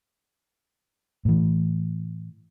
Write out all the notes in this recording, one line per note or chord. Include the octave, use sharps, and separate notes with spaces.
A2 E3